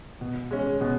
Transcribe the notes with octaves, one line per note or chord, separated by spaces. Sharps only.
B2
G#3 C#4
B2